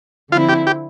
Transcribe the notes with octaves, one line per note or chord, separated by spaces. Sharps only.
D3 F3 C4 E4 F4
G4
G4